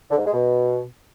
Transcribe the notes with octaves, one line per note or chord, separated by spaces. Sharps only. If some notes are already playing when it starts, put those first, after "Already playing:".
D3
G#2
G#3
B2